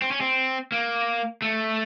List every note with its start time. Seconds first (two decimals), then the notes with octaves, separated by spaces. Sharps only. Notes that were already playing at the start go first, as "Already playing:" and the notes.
0.02 C4
0.11 C#4
0.21 C4
0.72 A#3
1.42 A3